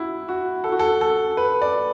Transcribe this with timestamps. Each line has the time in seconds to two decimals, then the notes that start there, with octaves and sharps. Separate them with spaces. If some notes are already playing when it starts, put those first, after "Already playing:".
Already playing: E4 F#4
0.28 F#4
0.64 A4
0.72 F#4
0.79 A4
1.01 A4
1.37 B4
1.62 D5